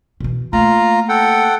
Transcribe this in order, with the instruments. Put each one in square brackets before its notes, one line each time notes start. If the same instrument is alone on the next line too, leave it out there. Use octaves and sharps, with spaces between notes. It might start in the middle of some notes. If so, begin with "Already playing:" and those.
[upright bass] B2 E3
[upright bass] A3 A#3 [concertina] F4 A#5
[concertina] A4 F#5 G5